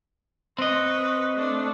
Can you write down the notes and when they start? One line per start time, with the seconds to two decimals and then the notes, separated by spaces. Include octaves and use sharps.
0.59 C4 B4 D#5 C#6
1.34 A3 D4